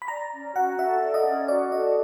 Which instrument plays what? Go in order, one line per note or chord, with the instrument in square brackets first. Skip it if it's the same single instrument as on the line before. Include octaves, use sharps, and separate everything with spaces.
[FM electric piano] B5
[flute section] D5 [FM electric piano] A#5
[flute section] C#4
[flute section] F#4 [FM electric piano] F#5
[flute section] A4 [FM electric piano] E5
[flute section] D5
[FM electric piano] D#5
[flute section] C#4
[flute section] F#4 [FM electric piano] D5
[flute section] A4 [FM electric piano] D#5